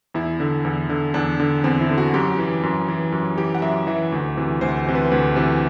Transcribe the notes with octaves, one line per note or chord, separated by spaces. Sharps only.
E2 E4
D3
E2
D3
E2 D4
D3
E2 C4
E4
D3
F#4
F#2 G4
E3
F#2
E3
F#2
E3 G4
F#5
F#2 E5
E3 E5
D2
C3 E3
D2 C5
C3 E3
B4
D2 B4
C3 E3